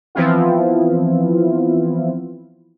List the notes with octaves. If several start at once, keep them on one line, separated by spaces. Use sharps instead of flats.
E3 F3 B3 C4 E4 F4